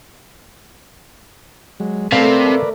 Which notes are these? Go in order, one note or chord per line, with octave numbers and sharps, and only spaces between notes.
F#3 G#3
C3 A3 A#4 B4 D5 F5